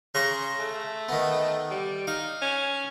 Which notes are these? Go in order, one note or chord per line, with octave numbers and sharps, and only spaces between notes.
C#3 A#5 C6 C#6
A3
D#3 B3
G3
D#4 F5
C#4